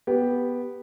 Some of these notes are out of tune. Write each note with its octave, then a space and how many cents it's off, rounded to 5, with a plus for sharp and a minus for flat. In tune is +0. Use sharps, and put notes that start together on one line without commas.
B3 -5 G4 +0